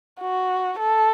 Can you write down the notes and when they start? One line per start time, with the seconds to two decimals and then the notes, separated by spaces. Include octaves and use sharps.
0.20 F#4
0.79 A4